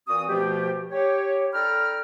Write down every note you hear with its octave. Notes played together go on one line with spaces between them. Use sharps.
A#2 E3 C4 F#4 D#6
B2 F3 A3 G4
G4 C#5
D4 A4 G5 A#5 B5 F6